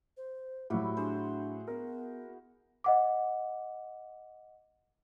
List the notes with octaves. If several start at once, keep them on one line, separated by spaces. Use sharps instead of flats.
C5
A2 F#3 G3 E4 F#4
D4 G#4 C5
B3 A#4
D#5 F#5 D6